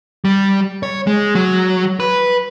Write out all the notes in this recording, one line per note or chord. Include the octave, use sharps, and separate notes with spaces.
G3
C#5
G#3
F#3
B4